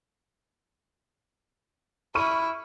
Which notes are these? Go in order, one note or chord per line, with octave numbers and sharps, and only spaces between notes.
E4 C#6 F6 D#7